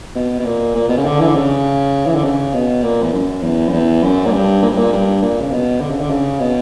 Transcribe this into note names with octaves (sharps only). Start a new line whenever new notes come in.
B2
B2
A#2
A#2
B2
C#3
D3
E3
D3
C#3
E3
D3
C#3
B2
A#2
E2
F#2
E2
F#2
E2
F#2
A#2
G2
A#2
G2
A#2
G2
A#2
C#3
B2
D3
C#3
D3
C#3
B2